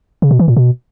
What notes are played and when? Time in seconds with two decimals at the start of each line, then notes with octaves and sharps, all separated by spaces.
0.22 C#3
0.31 B2
0.39 E3
0.48 A#2
0.57 B2